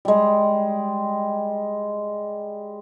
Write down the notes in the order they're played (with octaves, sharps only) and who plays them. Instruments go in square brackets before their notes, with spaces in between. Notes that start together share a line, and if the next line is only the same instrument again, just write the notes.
[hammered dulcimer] G3 G#3